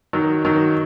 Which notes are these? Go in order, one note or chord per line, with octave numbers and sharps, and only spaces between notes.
D#3 F#3
D#3 F#3